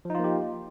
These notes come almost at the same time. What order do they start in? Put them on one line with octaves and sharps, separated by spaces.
F3 D#4 F4 A#3 G4